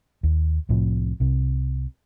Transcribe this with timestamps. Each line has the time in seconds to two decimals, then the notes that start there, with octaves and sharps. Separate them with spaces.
0.23 D#2
0.69 C2 A2 C3 F3
1.20 C2 C3